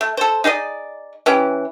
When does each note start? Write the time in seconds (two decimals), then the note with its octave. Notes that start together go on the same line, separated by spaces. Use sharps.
0.01 A3
0.17 A4 C5
0.44 D#4 G#4 D5 D#5
1.26 E3 C#4 G4